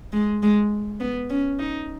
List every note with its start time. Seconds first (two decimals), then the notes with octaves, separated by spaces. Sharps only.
0.13 G#3
0.43 G#3
1.00 B3
1.30 C#4
1.59 D#4